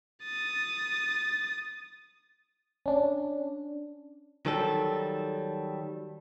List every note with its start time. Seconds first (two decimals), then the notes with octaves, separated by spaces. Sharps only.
0.24 D#6 A6
2.86 C#4 D4
4.46 D#3 F#3 G3 A4